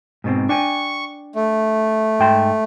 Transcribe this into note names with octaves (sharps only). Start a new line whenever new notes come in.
G#2 B2 C4
D4 G5 G#5 C#6
A3
G#2 G5 C6